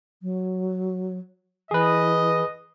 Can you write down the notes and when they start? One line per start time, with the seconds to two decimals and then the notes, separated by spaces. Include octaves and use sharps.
0.22 F#3
1.71 E3 G#4 B4 D#5